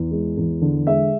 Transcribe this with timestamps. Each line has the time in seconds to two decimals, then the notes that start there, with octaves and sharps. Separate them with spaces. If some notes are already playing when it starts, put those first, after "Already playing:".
Already playing: E2
0.11 G#3
0.37 E2
0.62 D3
0.87 G#3 E5